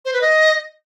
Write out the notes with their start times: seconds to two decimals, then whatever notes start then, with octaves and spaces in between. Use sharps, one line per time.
0.05 C5
0.13 B4
0.21 D#5